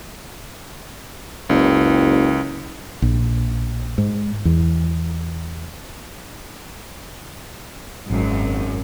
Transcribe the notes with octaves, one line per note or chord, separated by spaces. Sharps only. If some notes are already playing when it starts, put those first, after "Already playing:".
F#1 C#2
A#1
G#2
E2
G#1 F#2